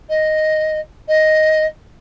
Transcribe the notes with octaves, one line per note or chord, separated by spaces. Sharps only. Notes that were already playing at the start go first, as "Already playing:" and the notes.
D#5
D#5